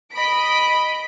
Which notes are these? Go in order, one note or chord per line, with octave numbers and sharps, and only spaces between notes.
D#5 B5 B6 D7